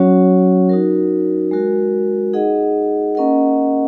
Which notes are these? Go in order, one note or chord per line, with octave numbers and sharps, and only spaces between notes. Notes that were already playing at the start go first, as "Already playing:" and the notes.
Already playing: F#3 C#4 F#4 C#5
D#4 F#4 A#4
G#3 F#4 A#4
D#4 G#4 D#5 F#5
A#3 C#4 A#4 D#5 F#5